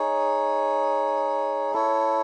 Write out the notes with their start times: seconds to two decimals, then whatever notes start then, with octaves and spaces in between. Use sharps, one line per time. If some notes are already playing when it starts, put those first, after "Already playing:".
Already playing: D#4 G#4 C#5
1.74 E4 A4 C#5